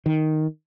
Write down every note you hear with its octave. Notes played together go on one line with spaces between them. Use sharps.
D#3